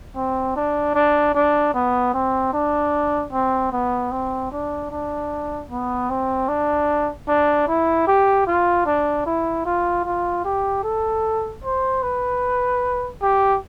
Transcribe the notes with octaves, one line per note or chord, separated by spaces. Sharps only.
C4
D4
D4
D4
B3
C4
D4
C4
B3
C4
D4
D4
B3
C4
D4
D4
E4
G4
F4
D4
E4
F4
F4
G4
A4
C5
B4
G4